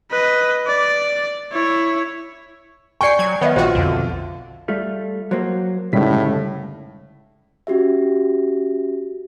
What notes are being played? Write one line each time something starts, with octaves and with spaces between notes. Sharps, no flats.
B4 D#5
D5
E4 C#5
D5 G5 G#5 C#6 C7 C#7
F#3 G#6
D#3 B3 C#5 D#5 E5
A#1 F4 F#4 C5 G5
B1 F2 D3
G3 A3 F4
F#3 A#3 C5
F#1 D2 A2 G3 G#3 C#4 D#4 B6
C#4 F#4 G4 E5